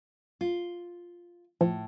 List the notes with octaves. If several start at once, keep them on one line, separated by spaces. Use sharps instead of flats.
F4
A2 F3